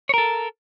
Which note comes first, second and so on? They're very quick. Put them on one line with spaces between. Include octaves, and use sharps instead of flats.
C#5 A#4 A4